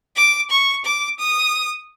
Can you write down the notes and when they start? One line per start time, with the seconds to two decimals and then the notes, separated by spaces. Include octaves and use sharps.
0.16 D6
0.51 C#6
0.85 D6
1.19 D#6